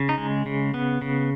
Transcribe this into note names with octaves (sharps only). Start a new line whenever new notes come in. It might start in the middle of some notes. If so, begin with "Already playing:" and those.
Already playing: C#3
D#4
G#3
C#3
B3
C#3